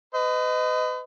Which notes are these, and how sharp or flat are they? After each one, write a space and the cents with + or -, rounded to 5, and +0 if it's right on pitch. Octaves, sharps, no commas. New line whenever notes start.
B4 +40 D#5 +0